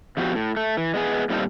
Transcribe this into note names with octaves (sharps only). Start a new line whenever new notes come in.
F2 F3 B3 F#4 G4
A2
A3
E3
G#3 B3 G#4
A#2 G3 C4 D#4 F4 A4